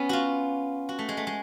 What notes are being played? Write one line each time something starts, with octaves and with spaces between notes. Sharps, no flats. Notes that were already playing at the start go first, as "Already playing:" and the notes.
Already playing: B3 C#4
F4 F#4
F#4
A3
G#3
A3
G#3